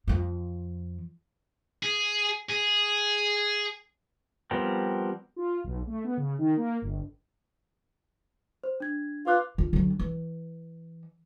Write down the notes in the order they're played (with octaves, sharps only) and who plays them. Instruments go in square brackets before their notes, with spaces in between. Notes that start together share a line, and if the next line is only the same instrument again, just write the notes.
[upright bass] F2 F3
[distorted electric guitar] G#4
G#4
[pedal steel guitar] F3 G3 B3 C4 A#4
[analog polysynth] F4
B1
A3
B3
C#3
D#3
A#3
G1
[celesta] C5
D4 G#6
[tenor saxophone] F4 [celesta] B4 D6 F#6
[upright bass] D3 F4
D3 F#3
E3